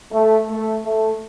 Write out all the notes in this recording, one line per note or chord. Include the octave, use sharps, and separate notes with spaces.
A3
A3
A3